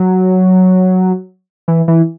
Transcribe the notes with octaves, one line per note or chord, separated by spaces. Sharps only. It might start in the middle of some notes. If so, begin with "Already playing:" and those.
Already playing: F#3
E3
E3